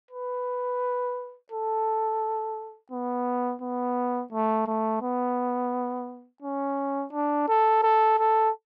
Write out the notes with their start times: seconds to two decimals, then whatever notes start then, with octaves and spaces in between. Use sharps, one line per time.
0.11 B4
1.52 A4
2.92 B3
3.61 B3
4.32 A3
4.67 A3
5.02 B3
6.42 C#4
7.13 D4
7.48 A4
7.83 A4
8.18 A4